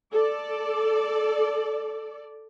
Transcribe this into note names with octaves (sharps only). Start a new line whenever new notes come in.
A4 D5